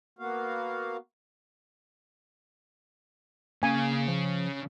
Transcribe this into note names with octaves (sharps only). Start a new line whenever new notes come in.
A#3 B3 F#4 F5
C#3 A#3 G#5
F3